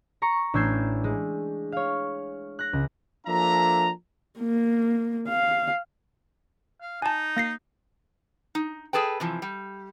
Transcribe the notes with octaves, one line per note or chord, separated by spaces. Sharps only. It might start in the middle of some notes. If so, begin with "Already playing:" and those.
A#5 C#6 C#7
A1 D4 E6 G6 G#6 C7
G#3
C#5 F5
F#6 A#6
C#2
F3 A#3 D4 A4 E5 A#5
A#3
F5
F5
D#4 G#5 A5
A#3 A#6 C7
D#4
G#4 A4 B4 G5
C3 E3 F3
G3